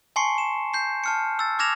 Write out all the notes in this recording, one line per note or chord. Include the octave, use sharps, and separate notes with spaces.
G#5 A5 C6 C#6 C7 C#7
E7
G6 C7
A5 F6 C#7
E6 A6
D6 F6 G#6 A#6 E7 F7